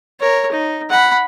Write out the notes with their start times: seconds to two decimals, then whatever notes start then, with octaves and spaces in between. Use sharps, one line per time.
0.20 A#4 C#5
0.52 D#4
0.90 F#5 B5